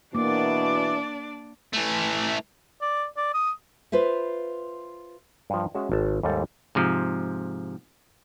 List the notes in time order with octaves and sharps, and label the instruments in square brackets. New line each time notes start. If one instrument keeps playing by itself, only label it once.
[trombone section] B2 E3 [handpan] A#3 [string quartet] D4 D5 [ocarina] D6
[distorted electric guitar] E3 A3
[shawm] D5
D5
D#6
[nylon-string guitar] F4 B4 C5 E5
[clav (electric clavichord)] G2 F3
G#3 C#4 F#4 E5
G#1 A5
D#2 G#2 G3 A4 C5
G#2 C3 F3